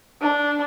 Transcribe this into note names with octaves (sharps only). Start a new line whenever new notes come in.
D4